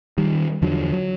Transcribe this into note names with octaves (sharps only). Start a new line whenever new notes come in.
D#3 G3
E2 D3 F3 F#3
F#3